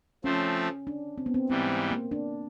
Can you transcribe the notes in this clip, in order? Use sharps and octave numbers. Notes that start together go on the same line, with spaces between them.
F3 A3 C4 C#4
D4
C4
B3
C4
G#2 E3 G3 C4
A#3
D4